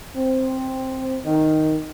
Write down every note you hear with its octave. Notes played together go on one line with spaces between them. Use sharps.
C4
D#3